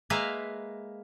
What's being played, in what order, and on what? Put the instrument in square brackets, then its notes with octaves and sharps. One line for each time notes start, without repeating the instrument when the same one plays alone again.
[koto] G#3 A#3 B4 E5 F5